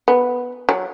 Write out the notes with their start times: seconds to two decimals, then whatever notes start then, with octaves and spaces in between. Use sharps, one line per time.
0.08 B3
0.69 F#3